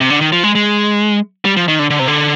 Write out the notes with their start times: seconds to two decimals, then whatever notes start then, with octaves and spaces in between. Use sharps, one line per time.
0.01 C3
0.10 D3
0.21 D#3
0.32 F3
0.44 G#3
0.55 G#3
1.45 G3
1.57 F3
1.68 D#3
1.79 D3
1.90 D3
1.99 C3
2.08 D3